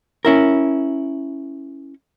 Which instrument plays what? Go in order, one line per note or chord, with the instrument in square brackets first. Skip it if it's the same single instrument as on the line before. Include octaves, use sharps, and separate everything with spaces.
[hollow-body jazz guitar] C#4 E4 A#4